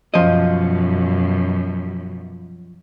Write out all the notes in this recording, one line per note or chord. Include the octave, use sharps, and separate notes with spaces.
F#2 B2 F3 D#5